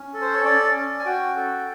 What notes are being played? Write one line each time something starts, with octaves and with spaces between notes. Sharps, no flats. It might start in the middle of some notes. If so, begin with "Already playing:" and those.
Already playing: C#4
A4
C5
C#5
C#4 D5
C#4
G#5
F#4 G5
A4